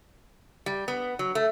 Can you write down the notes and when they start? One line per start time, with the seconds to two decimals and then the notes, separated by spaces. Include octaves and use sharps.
0.66 G3
0.88 B3
1.19 F#3
1.35 A3